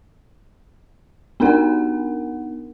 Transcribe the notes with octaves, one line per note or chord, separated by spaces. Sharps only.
B3 D4 D#4 A#4 F#5